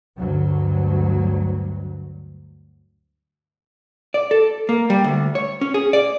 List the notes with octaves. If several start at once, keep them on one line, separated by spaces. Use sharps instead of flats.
D2 G2 F#3
D5
A4
A#3
G3
D2
C#5
C#4
G#4
D5